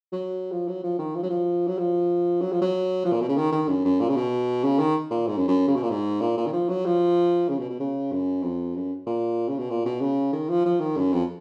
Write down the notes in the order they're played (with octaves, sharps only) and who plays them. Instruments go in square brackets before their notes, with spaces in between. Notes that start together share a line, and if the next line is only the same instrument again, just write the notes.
[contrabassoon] F#3
F3
F#3
F3
D#3
F3
F#3
F3
F#3
F3
F#3
F3
F#3
F3
A#2
B2
C#3
D#3
D#3
F#2
F#2
A#2
C#3
B2
C#3
D#3
A#2
G#2
F#2
F#2
C#3
B2
A#2
G#2
A#2
A#2
D#3
F3
F#3
F3
C#3
B2
B2
C#3
F#2
F2
F#2
A#2
C#3
B2
A#2
B2
C#3
D#3
F3
F3
D#3
F#2
F2